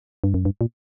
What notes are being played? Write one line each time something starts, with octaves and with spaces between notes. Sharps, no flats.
G2
F#2
G2
A#2